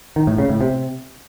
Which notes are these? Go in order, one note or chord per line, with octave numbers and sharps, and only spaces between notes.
D#3
A2
C#3
A2
C3